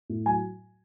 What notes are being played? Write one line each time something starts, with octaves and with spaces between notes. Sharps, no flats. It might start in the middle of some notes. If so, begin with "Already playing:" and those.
A2
F#3 G#5